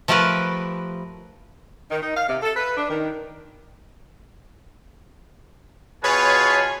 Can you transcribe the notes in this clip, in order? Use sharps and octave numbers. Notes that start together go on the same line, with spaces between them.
F3 A3 G4 A#4 B4
D#3
D#4
F5
C3
A4
B4
D4
D#3
B2 F4 G#4 B4 C#5 G#5